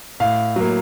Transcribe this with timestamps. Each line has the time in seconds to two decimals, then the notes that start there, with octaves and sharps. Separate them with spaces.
0.20 A2 F5
0.56 F#3 A#3